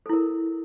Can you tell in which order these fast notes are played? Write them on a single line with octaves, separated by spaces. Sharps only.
A4 E4 A#4